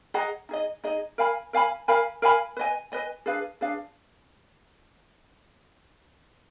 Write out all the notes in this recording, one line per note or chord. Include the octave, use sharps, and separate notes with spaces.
G#4 D#5 F#5 A#5
D#4 G#4 D#5
D#4 G#4 D#5
A#4 F5 G#5 B5
A#4 F5 G#5 B5
A#4 F5 G#5 B5
A#4 F5 G#5 B5
B4 D#5 G#5
B4 D#5 G#5
D4 G#4 B4 F5
D4 G#4 B4 F5